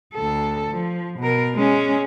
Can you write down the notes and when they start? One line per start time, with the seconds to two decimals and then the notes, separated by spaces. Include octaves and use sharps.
0.14 D2 A4
0.71 F3
1.19 B2 A#4
1.55 G#3 C#4